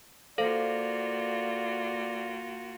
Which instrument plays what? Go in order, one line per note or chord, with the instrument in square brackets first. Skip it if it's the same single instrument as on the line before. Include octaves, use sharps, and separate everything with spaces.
[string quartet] A#3 F4 F#4 [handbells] A4 C5 F5 [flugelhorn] D5